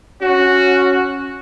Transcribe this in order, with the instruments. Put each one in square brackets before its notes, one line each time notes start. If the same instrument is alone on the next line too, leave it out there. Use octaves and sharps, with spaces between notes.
[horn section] C#4 F#4